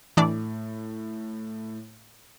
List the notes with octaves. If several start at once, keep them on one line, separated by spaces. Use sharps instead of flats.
A2 E3 D4 D5